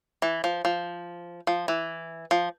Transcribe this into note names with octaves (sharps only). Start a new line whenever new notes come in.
E3
F3
F3
F3
E3
F3